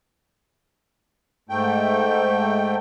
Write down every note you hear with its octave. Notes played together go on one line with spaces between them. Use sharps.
G#2 A3 G5